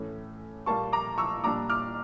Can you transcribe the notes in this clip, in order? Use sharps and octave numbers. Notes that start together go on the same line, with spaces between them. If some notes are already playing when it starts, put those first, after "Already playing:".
Already playing: A2 E3 A3 C#4
A#2 G3 A#3 A5 C#6
A#5 D6
C#6 E6
A#2 G3 D4 A#5 D6
D6 F6